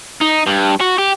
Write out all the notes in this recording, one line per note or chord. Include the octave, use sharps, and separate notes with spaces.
D#4
G2
F#4
G4